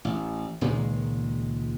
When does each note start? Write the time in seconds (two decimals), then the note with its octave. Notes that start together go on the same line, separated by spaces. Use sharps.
0.05 A1
0.61 C#2 A#2 D#3 G#3